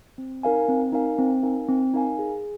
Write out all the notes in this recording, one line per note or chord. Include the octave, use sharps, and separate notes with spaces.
C4
D#4 A#4 F5 G#5
C4
D#4 A#4 F5 G#5
C4
D#4 A#4 F5 G#5
C4
D#4 A#4 F5 G#5
G#4